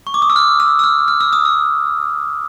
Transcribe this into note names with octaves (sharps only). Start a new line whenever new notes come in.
C#6
D6
D#6
E6
F6
E6
E6
F6
F6
E6
D#6
E6